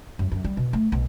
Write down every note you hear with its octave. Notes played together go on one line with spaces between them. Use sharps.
F#2
F#2
G3
B2
A3
B1